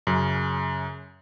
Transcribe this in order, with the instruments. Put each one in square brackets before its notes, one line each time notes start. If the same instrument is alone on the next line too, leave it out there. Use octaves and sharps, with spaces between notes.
[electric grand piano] F#2 C#3